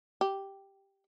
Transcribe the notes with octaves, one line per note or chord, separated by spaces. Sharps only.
G4